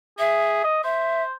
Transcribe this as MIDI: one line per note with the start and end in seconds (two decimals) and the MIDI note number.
0.19 0.59 68
0.19 0.63 76
0.64 0.81 75
0.84 1.33 72
0.84 1.23 76